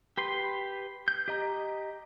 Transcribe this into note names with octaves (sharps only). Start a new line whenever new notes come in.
G4 B4 C6
G6
G4 D#5 A#5